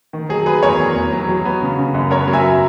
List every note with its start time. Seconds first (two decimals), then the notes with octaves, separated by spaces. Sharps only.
0.13 D#3
0.29 F#3 G#4
0.46 F#3 G#4 B4
0.63 E2 A#4 C#5
0.80 E2
0.96 E2
1.12 F#3
1.29 F#3
1.45 B3
1.62 C#3
1.79 C#3
1.95 F#2
2.11 B3 A#4 C#5
2.28 F#3
2.33 E5 G#5